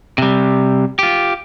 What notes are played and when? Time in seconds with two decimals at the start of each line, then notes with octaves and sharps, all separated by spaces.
0.18 C3 G3
0.99 F4 G4